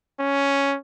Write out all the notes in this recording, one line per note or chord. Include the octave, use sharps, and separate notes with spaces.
C#4